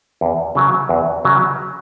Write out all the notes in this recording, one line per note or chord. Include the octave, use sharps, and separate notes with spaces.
E2
C#3 F#3
E2
C#3 F#3